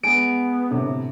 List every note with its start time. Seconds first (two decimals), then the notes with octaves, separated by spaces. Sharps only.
0.03 G#3 B3 G#5 D7
0.71 G1 A2 C3